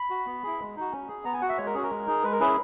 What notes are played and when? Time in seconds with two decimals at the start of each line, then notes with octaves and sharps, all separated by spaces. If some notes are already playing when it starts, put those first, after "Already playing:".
Already playing: B5
0.10 F#4
0.26 B3
0.44 E4 G#4
0.59 G#3
0.76 D#4 F#4
0.92 C#4
1.08 G#4
1.24 B3 A#5
1.34 G#5
1.41 F#4 F#5
1.49 E5
1.58 G#3 C#5
1.66 A#4
1.74 C#4 F#4 G#4
1.83 A#4
1.90 G#3
2.07 D#4 G#4
2.23 G#3 B4
2.32 A#4
2.40 C#4 E4 G#4 B4